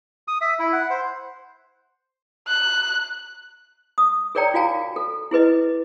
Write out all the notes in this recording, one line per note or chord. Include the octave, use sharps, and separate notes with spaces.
D#6
E5
E4
F#5
C5
F#6
D#6
G#4 A#4 C#5 D5 G5 A#5
F4 F#4 F5 G#5 A#5
A4
E4 G#4 B4 D#5